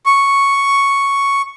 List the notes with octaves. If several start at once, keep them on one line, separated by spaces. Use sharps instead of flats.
C#6